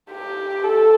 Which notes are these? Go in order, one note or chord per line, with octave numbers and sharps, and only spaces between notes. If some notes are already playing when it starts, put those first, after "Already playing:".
G4
A4